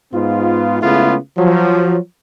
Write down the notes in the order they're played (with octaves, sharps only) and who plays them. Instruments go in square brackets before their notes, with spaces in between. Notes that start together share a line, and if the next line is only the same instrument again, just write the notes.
[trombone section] G#2 B3 F4
C#3 G#3 A3 B3 E4 F4
F3 F#3